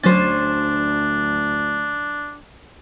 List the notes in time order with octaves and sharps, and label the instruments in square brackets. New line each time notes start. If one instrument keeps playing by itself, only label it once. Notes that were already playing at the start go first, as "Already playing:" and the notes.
[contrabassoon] D2 [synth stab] F#3 A6 [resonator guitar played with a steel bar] C#4 C5 [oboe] D4